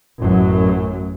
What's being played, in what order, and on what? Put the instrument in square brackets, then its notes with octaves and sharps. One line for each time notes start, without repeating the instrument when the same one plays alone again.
[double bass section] A1 F#2 F#3